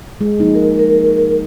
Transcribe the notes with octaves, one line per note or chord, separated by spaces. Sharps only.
G#3
F3 A#3 D#4
A#4
A#4